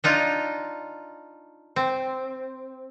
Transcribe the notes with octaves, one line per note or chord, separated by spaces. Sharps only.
D4 D#4 F4
C4